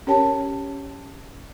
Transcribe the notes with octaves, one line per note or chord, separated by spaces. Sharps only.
C#4 G4 A#4 C#5 G5 A5